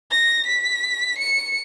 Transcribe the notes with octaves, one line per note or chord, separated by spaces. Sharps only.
A#6
B6
C#7